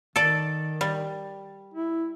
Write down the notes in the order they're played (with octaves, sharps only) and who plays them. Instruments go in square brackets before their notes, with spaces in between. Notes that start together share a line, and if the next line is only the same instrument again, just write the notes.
[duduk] D#3 [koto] A4 D5
[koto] G3
[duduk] E4